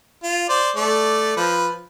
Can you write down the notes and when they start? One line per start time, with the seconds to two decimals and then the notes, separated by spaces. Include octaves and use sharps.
0.24 F4
0.49 C5 D5
0.76 A3 D5
1.37 F3 B4